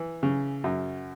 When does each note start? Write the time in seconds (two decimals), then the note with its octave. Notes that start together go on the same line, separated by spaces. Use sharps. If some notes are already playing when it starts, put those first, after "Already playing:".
Already playing: E3
0.23 C#3
0.64 F#2